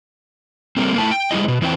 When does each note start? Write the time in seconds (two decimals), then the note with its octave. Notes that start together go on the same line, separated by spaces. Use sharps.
0.77 G3 A3 A#3 C4
0.98 A3 E4 G5 A5
1.11 G5
1.31 G3 G#3 B3 E4 D#5
1.48 B2
1.62 E2 E3 C4 G5